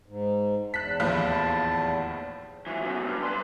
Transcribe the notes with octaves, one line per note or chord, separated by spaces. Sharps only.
G#2
E2 A5 F#6 B6
D#2 A2 F3
E3 F#3
F#2 B2
G2
B4 C6